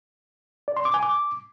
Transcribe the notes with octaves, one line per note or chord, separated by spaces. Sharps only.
D5
C6
D6
G#5
D6